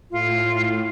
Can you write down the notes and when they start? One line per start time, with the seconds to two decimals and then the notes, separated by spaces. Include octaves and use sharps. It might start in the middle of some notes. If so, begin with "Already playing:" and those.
0.11 A2 F4